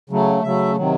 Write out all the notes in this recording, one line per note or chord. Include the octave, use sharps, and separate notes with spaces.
C#3 F#3 A3
C#3 F#3 A3 E5
C3 D#3 F#3